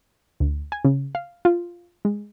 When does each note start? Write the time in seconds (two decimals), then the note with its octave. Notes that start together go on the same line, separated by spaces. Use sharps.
0.40 D2
0.72 G#5
0.85 C#3
1.15 F5
1.45 F4
2.05 G#3